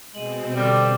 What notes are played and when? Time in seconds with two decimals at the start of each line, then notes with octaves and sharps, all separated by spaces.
0.15 B2 G#3 C4 D#7 F#7
0.56 D3 G3 D6 F6 G7